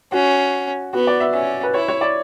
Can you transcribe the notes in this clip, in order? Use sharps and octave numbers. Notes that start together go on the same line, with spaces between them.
C#4 F#4
B3 F#4
D5
E5
C#4 E5
B4
E4 C#5
C#5
D5